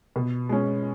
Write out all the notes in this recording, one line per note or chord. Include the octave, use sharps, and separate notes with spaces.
B2
G#3 C#4